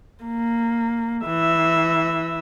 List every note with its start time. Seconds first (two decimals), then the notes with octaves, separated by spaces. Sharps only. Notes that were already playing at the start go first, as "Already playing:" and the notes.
0.25 A#3
1.26 E3 E5